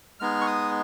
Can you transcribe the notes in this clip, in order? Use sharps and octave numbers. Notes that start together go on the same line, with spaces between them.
G#3 B3 D#4 G#4 F6
C#6
D#6